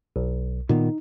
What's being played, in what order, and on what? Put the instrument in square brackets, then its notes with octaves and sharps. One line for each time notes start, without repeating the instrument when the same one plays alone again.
[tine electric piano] B1
[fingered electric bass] A#2 D#3 B3 [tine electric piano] D#4